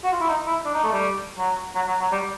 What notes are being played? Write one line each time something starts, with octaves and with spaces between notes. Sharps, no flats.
F#4
F4
E4
D#4
E4
D4
D#4
A3
G3
F#3
F#3
F#3
F#3
G3